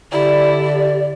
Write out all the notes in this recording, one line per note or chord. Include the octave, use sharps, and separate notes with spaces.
D3 E4 G4 D5